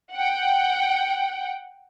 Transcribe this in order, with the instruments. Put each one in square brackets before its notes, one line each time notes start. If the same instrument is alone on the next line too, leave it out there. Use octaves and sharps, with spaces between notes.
[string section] F#5 G5